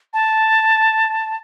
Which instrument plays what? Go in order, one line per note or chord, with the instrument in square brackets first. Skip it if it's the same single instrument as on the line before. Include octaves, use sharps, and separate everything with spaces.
[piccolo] A5